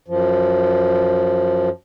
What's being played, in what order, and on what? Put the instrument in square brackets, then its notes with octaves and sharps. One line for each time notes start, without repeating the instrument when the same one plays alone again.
[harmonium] F#2 F3